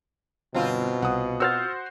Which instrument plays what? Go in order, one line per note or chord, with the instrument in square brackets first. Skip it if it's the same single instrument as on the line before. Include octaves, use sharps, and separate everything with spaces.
[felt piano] G1 [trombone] B2 [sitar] C4 F4
[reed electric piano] C2 [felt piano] F#5 D#6
[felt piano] F#4 C5 F#5 [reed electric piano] E6 F6 A6